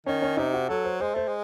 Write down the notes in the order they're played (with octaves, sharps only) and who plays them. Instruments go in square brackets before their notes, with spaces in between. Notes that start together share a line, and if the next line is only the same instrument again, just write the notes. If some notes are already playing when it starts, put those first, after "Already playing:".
[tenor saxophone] D#3 [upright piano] C#4
[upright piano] C#4
[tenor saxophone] C3 [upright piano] D#4
[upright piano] F#4
[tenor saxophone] F#3 [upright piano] A4
[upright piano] C5
[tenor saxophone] G#3 [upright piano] C5
[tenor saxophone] A3 [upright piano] C5
[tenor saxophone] G#3